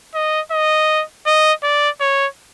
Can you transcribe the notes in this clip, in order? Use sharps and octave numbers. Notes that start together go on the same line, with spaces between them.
D#5
D#5
D#5
D5
C#5